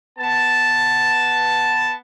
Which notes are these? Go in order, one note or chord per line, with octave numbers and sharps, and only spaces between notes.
B3 A5